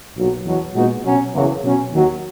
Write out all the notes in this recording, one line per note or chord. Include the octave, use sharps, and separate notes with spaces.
B1 A#2 F#3
E2 B2 F#3
A#2 G#3 B3 D#4 F#4
B2 F#3 C#4
F#1 E2 C#3 F#3 A#3
B2 F#3 C#4
D#2 D#3 F#3